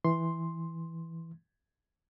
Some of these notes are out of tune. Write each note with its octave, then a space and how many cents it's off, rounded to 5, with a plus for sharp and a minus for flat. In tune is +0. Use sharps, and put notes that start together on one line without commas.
E3 -5 C6 +0